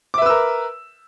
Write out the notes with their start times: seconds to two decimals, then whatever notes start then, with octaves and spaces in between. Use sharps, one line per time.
0.14 D6
0.18 E5
0.22 B4
0.26 E6
0.30 A#4